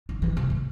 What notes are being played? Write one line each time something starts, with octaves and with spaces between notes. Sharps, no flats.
D3
E3
C3
A2